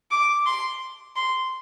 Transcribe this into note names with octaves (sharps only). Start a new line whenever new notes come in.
D6
C6
C6